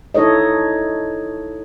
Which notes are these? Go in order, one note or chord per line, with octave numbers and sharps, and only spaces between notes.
D#4 E4 A4 C#5 D#5